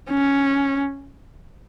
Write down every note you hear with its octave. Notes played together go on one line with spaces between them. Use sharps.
C#4